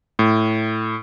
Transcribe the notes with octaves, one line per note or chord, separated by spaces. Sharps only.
A2